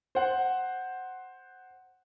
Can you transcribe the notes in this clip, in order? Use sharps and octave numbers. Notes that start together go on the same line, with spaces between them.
C5 F#5